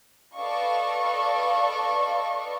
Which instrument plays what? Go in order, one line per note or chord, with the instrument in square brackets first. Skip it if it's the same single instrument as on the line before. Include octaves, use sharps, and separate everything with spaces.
[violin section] A4 B4 D5 D#5 F5 C#6